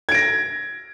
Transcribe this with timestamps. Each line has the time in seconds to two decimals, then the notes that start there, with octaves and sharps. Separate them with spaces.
0.09 G#6
0.12 D7
0.14 A#6